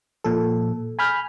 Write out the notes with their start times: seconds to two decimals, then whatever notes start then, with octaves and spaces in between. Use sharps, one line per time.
0.24 A#2 F3 A4
0.99 G#5 B5 F6 G6